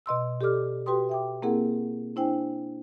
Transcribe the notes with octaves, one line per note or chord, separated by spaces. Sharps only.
B2 D#5 C6 E6
G4 A4 D5 D6 F6
F#4 G4 B4 G5 C6 D#6
E5 G5 D6
A#3 C4 E4 G#4 A#4 F#5
D4 E4 C5 G5 G#5